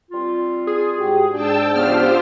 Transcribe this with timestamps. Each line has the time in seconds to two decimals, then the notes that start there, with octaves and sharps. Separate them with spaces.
0.11 G3 C4 F4
0.67 G#4
0.98 G#2 F#4 G4
1.33 G#2 D4 G5 A5 E6
1.76 C#3 E3 B3 F4 G4 C5 F6